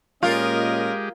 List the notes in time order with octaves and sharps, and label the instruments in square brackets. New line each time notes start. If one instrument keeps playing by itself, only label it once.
[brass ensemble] A#2 C#4 D#5 [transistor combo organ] G#3 G4 [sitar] F4 [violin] A#4